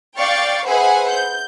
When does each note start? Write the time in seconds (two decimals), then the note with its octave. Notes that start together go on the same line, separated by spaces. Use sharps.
0.17 D5 F5 G5 C#6 A6
0.66 G#4 B4 C5 E5 F#5 G#5
1.09 G6